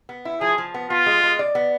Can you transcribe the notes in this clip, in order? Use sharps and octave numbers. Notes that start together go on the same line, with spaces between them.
B3
E4
F3 G#4
F3
B3
B3 F4
G#3
G#3
D5
B3